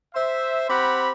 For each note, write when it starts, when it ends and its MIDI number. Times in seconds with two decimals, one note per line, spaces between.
0.14 0.65 72
0.14 0.65 76
0.68 1.10 60
0.68 1.10 67
0.68 1.10 78
0.68 1.10 83